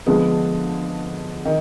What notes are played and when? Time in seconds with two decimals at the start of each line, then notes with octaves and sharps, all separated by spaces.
0.06 D3 F3 G#3 B3
1.45 D#3